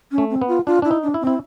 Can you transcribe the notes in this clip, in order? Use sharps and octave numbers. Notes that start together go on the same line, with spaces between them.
C#4
A3
C4
B3
F4
D4 F4
D4 E4
D#4
D4
E4
C4
E4